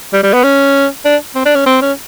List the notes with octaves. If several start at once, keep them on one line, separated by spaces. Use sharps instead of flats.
G3
G3
B3
C#4
D4
C4
D4
C#4
C4
C#4